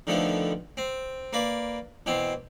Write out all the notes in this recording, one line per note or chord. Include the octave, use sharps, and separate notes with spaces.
D3 D#3 F3 A3 B3
C4
A#3 B4 D5
B2 E3 C4